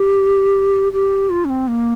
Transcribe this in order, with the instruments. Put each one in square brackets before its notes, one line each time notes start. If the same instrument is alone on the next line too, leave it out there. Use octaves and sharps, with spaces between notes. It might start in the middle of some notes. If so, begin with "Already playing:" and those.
Already playing: [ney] G4
G4
F4
C#4
C4
A#3